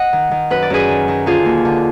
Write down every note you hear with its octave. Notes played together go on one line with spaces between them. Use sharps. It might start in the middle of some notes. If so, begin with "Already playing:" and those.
Already playing: D#5 F#5
D#3
D#3
F#2 B4
D5
F#2 G#4 B4
D#3
D#3
D3 F4 G#4
D#2
D3